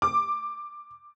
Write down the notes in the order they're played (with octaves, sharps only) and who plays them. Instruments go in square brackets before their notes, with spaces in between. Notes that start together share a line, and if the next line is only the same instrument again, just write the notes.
[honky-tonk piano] D6